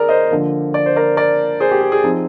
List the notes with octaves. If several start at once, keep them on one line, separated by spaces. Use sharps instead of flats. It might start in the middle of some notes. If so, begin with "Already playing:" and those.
Already playing: D#3 G#4 A#4 D5
C5 D#5
D3 F3 A#3
D5
C5
A#4 D5
A#4 D5
G#4 C5
G4
G#4
G#4
F3 C4 D#4